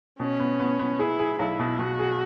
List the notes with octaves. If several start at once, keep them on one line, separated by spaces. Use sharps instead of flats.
B2 C#4
B3
B3
B3
E4 G#4
G#4
B1 E4
B2
B2 F#4
G#4